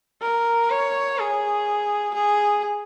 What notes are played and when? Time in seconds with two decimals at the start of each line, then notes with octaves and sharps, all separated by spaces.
0.22 A#4
0.70 C#5
1.18 G#4
2.14 G#4